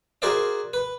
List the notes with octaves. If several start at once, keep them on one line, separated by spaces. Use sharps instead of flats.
F#4 G#4 A#4 C5 D5 E5
B4